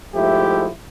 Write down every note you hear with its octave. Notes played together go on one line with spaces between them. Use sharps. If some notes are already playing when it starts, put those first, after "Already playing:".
G#2 F3 A3 E4 G4